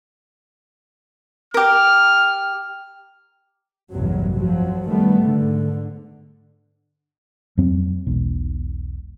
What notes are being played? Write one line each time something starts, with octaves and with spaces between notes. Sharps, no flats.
G4 A#4 F6
A1 E2 G2 C3 F#3
F2 F3 F#3
D#3 G3 A3 B3
G#2 D3
F2 F#3 C4
E1 B1